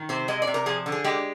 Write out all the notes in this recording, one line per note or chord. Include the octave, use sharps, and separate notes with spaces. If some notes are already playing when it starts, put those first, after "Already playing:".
Already playing: D#3
C3 C5
G#3 D#5
D5
C3
A#4
F3 G#4
D3
G#4
G#3 G4